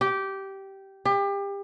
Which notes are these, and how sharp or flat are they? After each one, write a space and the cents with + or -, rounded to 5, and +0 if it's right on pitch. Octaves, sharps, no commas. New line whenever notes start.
G4 -15
G4 +30